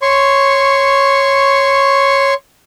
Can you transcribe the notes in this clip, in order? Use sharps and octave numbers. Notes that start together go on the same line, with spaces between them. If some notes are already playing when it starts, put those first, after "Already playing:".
C#5 C6 C#6